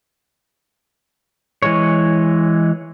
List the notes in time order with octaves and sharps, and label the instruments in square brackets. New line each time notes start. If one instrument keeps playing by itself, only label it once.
[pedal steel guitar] E3 G#3 C#5